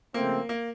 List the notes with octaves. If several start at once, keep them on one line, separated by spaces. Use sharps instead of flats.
C#3 F3 A3 A#3 C4
A#3